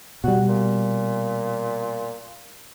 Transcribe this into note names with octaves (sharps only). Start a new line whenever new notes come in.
B2 G3 F#4
A#2